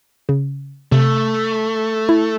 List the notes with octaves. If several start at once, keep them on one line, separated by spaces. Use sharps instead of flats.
C#3
C3 A3
E4